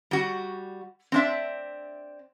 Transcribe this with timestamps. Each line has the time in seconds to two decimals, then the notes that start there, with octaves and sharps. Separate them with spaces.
0.11 G3 F#4
1.12 C4 D4 E5